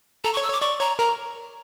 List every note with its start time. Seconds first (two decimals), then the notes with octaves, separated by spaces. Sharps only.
0.24 A4 A#5
0.33 C#6
0.37 C#5
0.43 E6
0.49 C#5 D6
0.61 D5 C#6
0.80 C#5 A#5
0.99 A#4 A#5